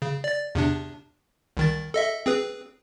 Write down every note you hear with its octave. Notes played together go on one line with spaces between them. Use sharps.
C#3
D5 A6
E2 C3 D4
C2 D#3 A6
A4 D#5 E5
C4 G#4 B4